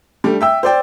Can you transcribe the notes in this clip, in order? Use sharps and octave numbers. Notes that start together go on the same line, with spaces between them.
G3 A3 D4
E5 G5 E6
C5 D5 G5